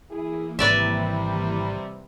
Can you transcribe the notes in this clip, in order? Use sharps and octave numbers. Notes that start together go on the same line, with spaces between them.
E3 A#3 E4 G#4
G#1 C3 G3 B4 D5 E5